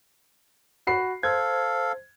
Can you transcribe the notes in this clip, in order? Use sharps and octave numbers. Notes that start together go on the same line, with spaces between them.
F#4 B5 C7
A4 C5 F5 G#6